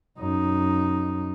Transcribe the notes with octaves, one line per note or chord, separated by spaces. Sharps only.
F#2 D#4